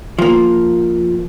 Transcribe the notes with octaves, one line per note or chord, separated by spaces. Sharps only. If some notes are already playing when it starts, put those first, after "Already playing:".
F3 A#3